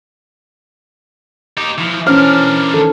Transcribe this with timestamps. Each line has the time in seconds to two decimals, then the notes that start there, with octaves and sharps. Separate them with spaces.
1.57 D#4 G4
1.78 E3 F3
2.07 E3 C#4 D4 A#4 C5 F6
2.74 D#3 A4